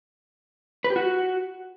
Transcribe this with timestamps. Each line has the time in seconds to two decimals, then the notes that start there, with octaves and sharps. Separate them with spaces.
0.84 B4
0.90 G4
0.96 F#4